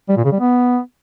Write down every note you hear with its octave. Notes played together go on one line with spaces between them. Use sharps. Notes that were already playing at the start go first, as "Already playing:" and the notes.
G3
A#2
C#3
G3
B3